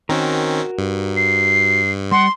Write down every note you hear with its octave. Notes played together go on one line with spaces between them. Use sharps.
D#3 C4 C#4 F#4 A#4
G2
C7
G3 F#5 C6